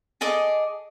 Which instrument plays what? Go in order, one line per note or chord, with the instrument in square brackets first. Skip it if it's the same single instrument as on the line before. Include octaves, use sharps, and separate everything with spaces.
[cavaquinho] G#4 A4 D#5 D6